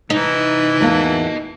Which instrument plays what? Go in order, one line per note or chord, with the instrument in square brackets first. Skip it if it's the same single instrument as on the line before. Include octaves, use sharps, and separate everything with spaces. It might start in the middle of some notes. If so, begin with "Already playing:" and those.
[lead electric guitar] C3 D#5 [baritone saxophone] E3 [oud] D#4
[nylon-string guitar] E2 A#3 [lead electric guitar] D#5 A5